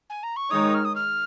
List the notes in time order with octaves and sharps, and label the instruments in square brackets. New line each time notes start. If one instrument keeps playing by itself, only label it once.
[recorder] G#5
A#5
C#6
[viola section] D#3 G#3 D#4 C#5 [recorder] D#6
[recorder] F6
D#6
F6